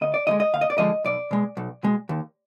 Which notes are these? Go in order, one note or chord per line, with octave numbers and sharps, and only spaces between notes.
D2 D#5
D5
D3 F3 G#3 D#5
D#5
D2 F5
D#5
D5
D3 F3 G#3 D#5
B1 D5
B2 G#3
B1
B2 G#3
D#2